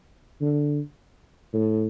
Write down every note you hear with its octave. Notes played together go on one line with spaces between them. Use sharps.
D3
A2